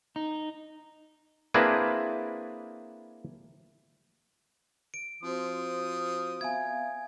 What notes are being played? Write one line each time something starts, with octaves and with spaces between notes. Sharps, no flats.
D#4
A#3 C4 D4 E4 G#4 B4
D7
F3 C4 F#4 C5 D#6
B3 E5 F5 G#5 G#6